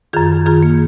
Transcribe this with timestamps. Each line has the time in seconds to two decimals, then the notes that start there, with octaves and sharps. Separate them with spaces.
0.13 F#2 D#3 F4 G#4
0.46 F#2 D#3 F4 G#4
0.63 A#3